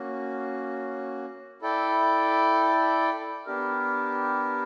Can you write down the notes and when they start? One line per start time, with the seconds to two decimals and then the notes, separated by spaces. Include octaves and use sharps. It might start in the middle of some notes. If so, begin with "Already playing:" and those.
Already playing: A#3 C#4 F#4
1.62 E4 A4 D5 G5
3.46 B3 D4 G4 A#4